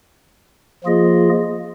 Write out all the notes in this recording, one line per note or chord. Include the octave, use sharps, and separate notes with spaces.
F3 A#3 F4 G#4 D#5